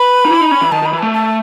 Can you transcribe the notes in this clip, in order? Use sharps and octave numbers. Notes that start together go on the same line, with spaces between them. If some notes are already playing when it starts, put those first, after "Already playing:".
Already playing: B4 B5
D#4
E4
D#4
C#4
E3
D#3 A5
D#3 B5
E3
A3 A5
A5